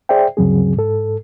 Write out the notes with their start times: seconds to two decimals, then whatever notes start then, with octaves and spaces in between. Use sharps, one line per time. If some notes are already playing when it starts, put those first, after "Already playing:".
0.09 G#4 C5 D5 E5 G5
0.37 D2 G2 C#3 F#3 C4 G#4
0.77 G#2 A4